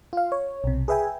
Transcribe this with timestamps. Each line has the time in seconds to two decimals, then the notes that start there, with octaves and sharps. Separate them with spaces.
0.13 F4 F5
0.32 C#5
0.64 B1 C3
0.88 G#4 B4 E5 G5 G#5